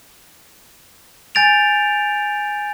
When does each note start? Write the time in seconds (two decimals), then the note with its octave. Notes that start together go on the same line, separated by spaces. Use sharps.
1.35 G#5 G6 A6 D7 F7